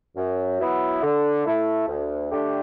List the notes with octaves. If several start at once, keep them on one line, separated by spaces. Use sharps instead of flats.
F#2
F#3 B3 E4
D3
A3 E4
D2
D3 A3 D4 G4